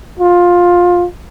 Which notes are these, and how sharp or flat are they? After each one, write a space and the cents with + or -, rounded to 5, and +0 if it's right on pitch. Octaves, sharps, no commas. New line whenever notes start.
F4 +15